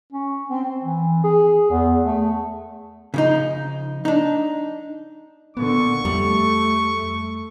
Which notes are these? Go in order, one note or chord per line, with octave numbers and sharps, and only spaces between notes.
C#4
C4
E3
G#4
E2
A3
C#3 F3 D#4
D4 D#4
A#2 D3 B3 C#6
F2 G3 A3